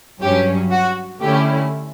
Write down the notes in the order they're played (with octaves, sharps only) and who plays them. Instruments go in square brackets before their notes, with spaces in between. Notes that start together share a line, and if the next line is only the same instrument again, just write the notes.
[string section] G2 F#3 C#4 G4
F#4
D3 A3 C#4 E4 G4